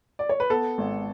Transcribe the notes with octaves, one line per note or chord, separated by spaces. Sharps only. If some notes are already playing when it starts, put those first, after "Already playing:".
D5
C#5
B4
B3 A4
G#1